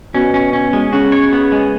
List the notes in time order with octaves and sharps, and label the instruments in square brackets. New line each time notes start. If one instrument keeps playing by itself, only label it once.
[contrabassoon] B2 [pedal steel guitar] C#4
[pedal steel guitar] C#4
C#4
G#3
[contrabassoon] C#3 [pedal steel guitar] F#4
[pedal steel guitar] C#5
B3
G#3